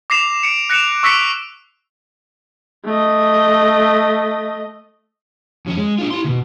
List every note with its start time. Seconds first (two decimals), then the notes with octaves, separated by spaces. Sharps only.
0.10 D6 A#6 C7 E7 F7
0.43 C#7 D7
0.70 F#6 A#6 C#7 D7 E7 F7
1.03 C#6 E6 A#6 B6 C#7 D7
2.85 A3 D#5
5.66 F2 C#4
5.78 G#3
5.98 D4 F4
6.11 E4 C6
6.24 D2 B2